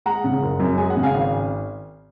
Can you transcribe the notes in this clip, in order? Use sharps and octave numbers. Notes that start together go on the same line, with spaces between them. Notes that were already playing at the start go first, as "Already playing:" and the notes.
G#3 F#5 A#5
C#3
F#1
F#2
G#3 G#5
F#5
C#3
F5 G#5
G#1